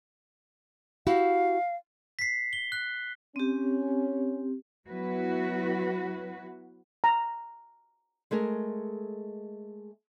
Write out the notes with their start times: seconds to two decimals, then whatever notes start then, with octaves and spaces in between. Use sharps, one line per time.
1.07 E4 F#4 G4 F5
2.19 B6 C7
2.53 G7
2.72 F#6
3.36 C4 C#4 G4
4.88 F#3 B3 E4 F#4 B4
7.04 A#5
8.31 G#3 A3 G#4 A#4